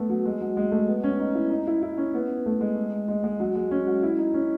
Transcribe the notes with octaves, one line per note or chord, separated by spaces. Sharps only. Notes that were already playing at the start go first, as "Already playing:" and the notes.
Already playing: A3 B3
F#3
G#3
F#3
G#3
A3
B3
C#4
D#4
E4
D#4
E4
E4
C#4
B3
A3
G#3
G#3
G#3
F#3
G#3
C#4
F#4
E4
D#4
C#4